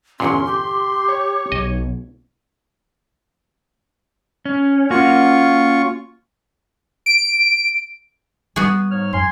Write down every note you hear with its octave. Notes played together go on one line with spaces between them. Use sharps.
G1 E2 A#2 C#4 C6
G4
C#5
B1 D#5
C#4
A#3 C#4 F4 F#4 C#6
D7
G3 B3 F#4 G#4
G#2 C#5 F6
F#2 G#5 C6